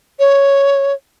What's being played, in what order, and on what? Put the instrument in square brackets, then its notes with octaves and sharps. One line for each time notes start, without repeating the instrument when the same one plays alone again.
[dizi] C#5